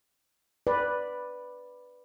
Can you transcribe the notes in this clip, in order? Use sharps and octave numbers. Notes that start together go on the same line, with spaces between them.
B4 D5